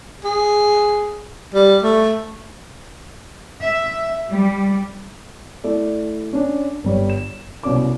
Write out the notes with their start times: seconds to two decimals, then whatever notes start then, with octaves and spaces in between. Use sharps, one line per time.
0.24 G#4
1.54 G3
1.83 A3
3.63 E5
4.29 G3
5.64 A3 E4 D5
6.33 C#4 D4
6.84 G1 G3 C#5
7.10 E7
7.63 C2 B2 C#4 D5 D6